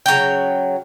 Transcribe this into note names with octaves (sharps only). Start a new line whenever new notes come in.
C#3 F#3 C#5 G5